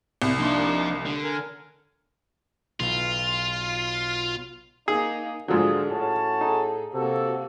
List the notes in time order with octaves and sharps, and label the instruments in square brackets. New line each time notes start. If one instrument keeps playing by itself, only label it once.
[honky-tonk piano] C2
[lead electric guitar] F3 C6 [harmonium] A#3 D4 D#4
[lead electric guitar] D3
[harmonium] A#4 G#5
[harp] B1 [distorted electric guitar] F4
[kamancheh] A#3 D#4 [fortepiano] G#4
[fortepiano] G#2 F3 F#3 [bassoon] D3 [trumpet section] F4 D#6 [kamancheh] G#4
[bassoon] A2 [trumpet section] C#4 F#4 A5
[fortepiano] D#4 [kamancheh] G#4 A4
[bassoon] C3 [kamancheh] A#3 F#4 [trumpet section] A4